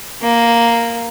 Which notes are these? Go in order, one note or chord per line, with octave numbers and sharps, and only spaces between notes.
A#3